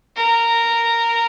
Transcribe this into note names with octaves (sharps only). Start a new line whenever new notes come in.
A#4